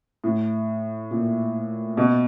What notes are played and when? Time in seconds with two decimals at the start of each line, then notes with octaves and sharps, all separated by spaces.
0.24 A2
1.11 A#2
1.97 B2